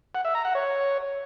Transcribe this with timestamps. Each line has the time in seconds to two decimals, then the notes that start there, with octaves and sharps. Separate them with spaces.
0.15 F#5
0.25 E5
0.35 A#5
0.45 F#5
0.55 C#5